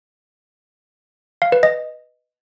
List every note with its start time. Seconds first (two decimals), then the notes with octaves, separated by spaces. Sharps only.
1.42 F5
1.52 B4
1.63 D#5